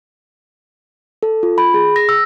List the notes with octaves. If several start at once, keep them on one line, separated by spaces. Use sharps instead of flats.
A4
F4
B5
G#4
A#6
E6